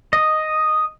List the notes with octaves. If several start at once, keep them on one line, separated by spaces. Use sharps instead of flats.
D#5